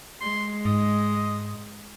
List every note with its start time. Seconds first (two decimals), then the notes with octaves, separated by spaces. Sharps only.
0.21 G#3 C6
0.65 G#2 D#5